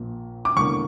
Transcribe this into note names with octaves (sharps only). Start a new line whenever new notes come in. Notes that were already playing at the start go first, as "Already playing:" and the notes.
Already playing: A#1 A#2 A#3
D6
E1 E2 D3 A#3 C#6